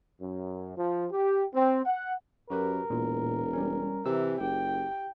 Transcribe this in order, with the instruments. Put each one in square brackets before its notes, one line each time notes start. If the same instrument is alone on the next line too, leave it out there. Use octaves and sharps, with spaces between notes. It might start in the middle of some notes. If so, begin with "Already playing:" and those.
[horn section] F#2
F3
G4
C4
F#5
[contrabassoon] F#2 [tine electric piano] F#4 G4 B4 [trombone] A#4
[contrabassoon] E1 [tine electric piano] A#2
[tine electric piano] G3 C#4
[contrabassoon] C3 [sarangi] E3 [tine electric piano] E6
[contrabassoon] F#1 [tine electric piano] G4 [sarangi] G5